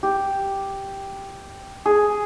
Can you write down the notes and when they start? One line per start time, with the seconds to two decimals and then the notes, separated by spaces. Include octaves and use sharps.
0.03 G4
1.86 G#4